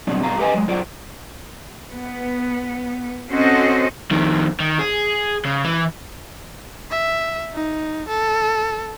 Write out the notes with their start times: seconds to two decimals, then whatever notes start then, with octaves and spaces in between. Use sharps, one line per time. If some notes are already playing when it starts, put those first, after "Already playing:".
0.07 B2 F#3 G3 C4 D4
0.23 G2 B2 F5 A#5
0.38 G4 A#4 B4 D#5 G#5
0.54 F#3 G#3
0.68 F#3 F4 C5 D5
1.91 B3
3.30 C4 C#4 F#4 A4 C5 D#5
4.11 F2 D#3
4.60 D#3
4.79 G#4
5.45 C#3
5.65 E3
6.91 E5
7.53 D#4
8.08 A4